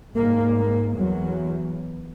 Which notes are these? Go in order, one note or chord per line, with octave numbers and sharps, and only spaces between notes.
G#2 A#3
A#3
E2 F#3